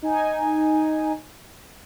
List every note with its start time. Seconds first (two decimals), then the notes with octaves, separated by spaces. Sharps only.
0.02 D#4 G#5